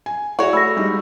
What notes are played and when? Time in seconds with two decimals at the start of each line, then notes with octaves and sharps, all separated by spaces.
0.06 G#5
0.39 E4 F#4 G#4 C#5 D5
0.53 A3 B5 E6 A#6
0.76 G3 G#3 D#4